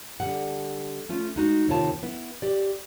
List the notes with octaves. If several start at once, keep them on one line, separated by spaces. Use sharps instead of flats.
D3 G3 F#5
A3 C#4 F4
G#3 D#4 F#4
D#2 C3 D#3 F4 C#5 A5
B3 E4
G4 D5